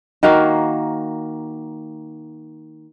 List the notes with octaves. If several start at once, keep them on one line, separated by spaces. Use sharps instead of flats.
D#3 A#3 F#4 F5